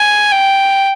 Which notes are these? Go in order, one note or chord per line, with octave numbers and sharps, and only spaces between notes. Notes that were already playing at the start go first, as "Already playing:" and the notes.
Already playing: G#5
G5